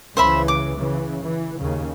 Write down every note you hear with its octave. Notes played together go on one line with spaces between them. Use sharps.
C#2 C#3 E3 C5 E5 B5
D6
C#3 E3
E3
D#2 C#3